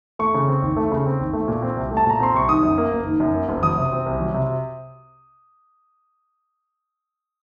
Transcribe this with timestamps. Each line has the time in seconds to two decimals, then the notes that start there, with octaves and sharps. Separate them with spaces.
0.19 A3 C#6
0.34 C#3
0.48 C4
0.62 D#2
0.77 A3
0.92 C#3
1.06 C4
1.20 D#2
1.33 A3
1.48 A#2
1.62 C4
1.77 C2
1.91 A3
1.97 A5
2.06 A#2 A#5
2.20 C4 C6
2.34 C2 C#6
2.48 D#3 D#6
2.63 F#2
2.78 A#3
2.91 F#1
3.06 D#3
3.20 F#2
3.35 A#3
3.49 F#1
3.63 F#3 D#6
3.78 C3
3.92 C4
4.06 C2
4.20 F#3
4.34 C3